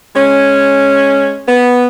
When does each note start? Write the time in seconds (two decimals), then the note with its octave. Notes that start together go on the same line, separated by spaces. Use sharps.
0.16 G#3 C#4
1.48 B3